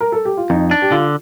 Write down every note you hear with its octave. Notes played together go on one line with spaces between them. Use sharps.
A#4
A4
G4
F4
F2 D#4
D4
G4
D3 F4